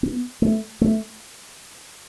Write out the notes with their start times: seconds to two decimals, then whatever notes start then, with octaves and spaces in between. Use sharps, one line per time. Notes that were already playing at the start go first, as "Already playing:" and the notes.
0.03 B3
0.42 A3
0.81 A3